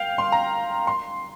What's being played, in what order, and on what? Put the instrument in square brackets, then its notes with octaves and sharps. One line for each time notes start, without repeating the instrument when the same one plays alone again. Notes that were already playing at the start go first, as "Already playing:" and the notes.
Already playing: [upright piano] F5 G5
C6
A#5
C6